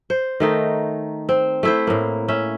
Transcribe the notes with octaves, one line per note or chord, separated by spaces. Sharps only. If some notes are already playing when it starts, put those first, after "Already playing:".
C5
D#3 A3 D#4
C4
A3 E4 C5
A2 A#3
C#4 E5